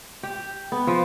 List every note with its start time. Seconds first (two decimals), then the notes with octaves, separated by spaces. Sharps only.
0.23 G4
0.72 B3
0.87 F3